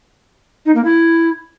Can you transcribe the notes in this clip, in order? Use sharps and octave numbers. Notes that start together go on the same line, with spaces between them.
D#4
A#3
E4